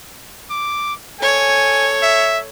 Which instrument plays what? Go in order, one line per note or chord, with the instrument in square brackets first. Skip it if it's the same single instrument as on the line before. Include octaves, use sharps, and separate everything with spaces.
[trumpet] D6
[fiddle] A4 C#5 [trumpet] G#5
[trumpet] E5